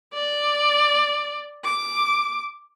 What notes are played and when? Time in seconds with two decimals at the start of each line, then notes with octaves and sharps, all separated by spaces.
0.13 D5
1.64 D6